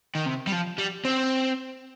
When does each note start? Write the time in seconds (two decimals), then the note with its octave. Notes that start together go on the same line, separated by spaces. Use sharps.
0.15 D#3
0.26 C3
0.47 G3
0.52 F3
0.78 G3
1.05 C4